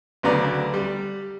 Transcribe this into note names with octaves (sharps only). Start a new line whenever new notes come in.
D2 C#3 F#3 B3 D5 A#5
G3